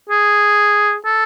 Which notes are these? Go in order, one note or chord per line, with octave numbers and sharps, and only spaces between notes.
G#4
A4